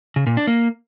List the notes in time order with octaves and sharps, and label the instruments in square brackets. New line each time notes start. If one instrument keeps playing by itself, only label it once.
[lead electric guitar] C#3
A#2
D4
A#3